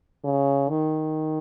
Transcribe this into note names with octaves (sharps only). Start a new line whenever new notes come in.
C#3
D#3